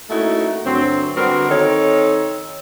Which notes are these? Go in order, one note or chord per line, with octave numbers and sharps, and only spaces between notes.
A3 A#3 C#4 D#4 E4 F#4
D2 G2 F#3 C4
D3 G3 B3 C4 F#4 A#4
D#3 C4 D#4 A4 C#5